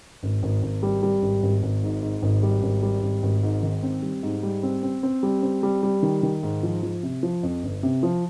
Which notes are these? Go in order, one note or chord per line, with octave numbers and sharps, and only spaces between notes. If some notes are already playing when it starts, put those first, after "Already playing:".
G#1
G#1
G#1
G3
G3
G#1
G#1
G#1
G#2
G#2
G#1
G3
G#1
G3
G#1
G#1
G#2
D#3
C4
G3
G#2
G3
C4
C4
C4
G3
C4
G3
G3
D#3
D#3
G#2
F3
F3
C3
F3
F2
G1
C3
F3